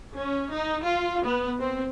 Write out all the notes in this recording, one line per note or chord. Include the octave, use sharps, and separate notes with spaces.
C#4
D#4
F4
B3
C4